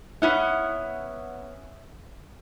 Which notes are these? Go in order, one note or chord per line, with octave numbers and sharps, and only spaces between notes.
B3 C#4 E4 F#5